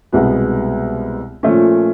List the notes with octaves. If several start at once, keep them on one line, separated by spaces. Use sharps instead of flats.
C2 B2 G#3 B3
A#2 F3 A3 C#4